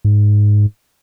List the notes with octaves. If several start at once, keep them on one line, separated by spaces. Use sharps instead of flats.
G#2